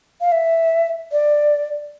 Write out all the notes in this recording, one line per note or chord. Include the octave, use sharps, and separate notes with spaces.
F5
E5
D5